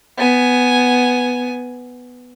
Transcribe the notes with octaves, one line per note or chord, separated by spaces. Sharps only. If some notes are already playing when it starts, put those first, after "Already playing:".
B3 G#5